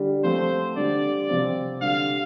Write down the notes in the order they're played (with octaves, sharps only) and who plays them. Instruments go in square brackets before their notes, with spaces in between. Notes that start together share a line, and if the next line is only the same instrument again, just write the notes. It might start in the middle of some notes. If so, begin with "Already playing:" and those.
Already playing: [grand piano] D3 G3 D4
[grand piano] F3 A3 C4 [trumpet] C5
[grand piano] D3 G3 D4 [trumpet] D5
[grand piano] C3 F3 C4
[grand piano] D3 G3 D4 [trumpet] F5